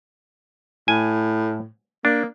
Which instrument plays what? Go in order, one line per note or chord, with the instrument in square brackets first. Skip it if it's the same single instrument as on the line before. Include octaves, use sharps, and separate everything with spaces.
[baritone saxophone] A2 [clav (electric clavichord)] G#5
[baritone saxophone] A#3 [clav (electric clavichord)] D4